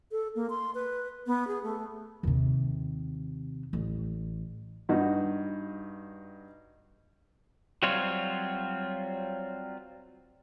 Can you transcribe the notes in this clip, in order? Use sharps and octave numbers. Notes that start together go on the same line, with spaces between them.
A4
A#3
C6
B4
B3
G#4
A3
D#2 C3
A1
G2 D#4 F#4
F#3 G3 C4 F4 C#5